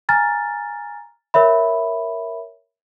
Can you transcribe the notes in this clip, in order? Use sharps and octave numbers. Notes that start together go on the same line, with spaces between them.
G#5 A#5 F6 A6
A#4 C#5 E5 B5